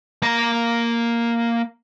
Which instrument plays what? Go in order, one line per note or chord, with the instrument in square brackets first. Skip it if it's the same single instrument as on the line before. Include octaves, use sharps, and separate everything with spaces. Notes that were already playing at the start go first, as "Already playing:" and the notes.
[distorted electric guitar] A#3 A#5